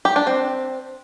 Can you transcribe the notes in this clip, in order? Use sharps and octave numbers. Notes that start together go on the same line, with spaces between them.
G4
D4
C4